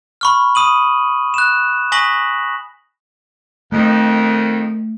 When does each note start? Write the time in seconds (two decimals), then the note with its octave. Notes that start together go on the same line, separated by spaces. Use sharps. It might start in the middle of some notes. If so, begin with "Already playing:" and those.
0.21 B5 C#6 F6
0.55 B5 D#6 D#7 F#7
1.34 F#6 E7
1.92 G#5 C#6 D#6 A#6 B6 F#7
3.72 F2 D#3 A3